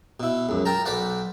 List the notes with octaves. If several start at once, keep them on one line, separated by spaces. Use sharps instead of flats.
B2 E4
C#2 F#2
A#4 G5 A5 A#5
B1 B4 C5 D5 F#5